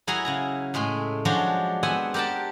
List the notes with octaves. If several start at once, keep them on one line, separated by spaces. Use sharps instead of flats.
F#3 E4 G#4 F#5 G#5 A#5
C#3 F#5 A#5
A2 G#3 A3 G#5
F3 F#3 G#3 D4 F#4 C#5
B3 C4 E5 F#5 G#5
G4 A#4 F#5 G5 A5